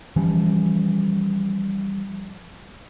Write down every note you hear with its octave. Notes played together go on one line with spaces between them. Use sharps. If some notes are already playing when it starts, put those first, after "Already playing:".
E3 F3 G3 C#4